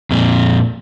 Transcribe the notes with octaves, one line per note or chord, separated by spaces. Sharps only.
F2 A#2